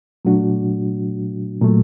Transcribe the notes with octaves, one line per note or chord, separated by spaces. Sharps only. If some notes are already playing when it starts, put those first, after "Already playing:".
A#2 F#3 A3 D4 F#4
A#2 F#3 A3